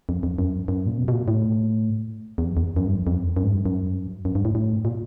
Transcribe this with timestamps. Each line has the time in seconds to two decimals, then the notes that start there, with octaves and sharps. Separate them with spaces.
0.09 F2
0.23 F2
0.38 F#2
0.68 F#2
0.86 A#2
0.98 B2
1.08 B2
1.13 A#2
1.28 A2
2.38 E2
2.46 F2
2.57 E2
2.76 F#2
2.86 G2
2.96 F2
3.07 F2
3.37 F#2
3.43 G#2
3.51 G2
3.66 F#2
4.25 F#2
4.35 G2
4.45 A2
4.55 A2
4.85 A#2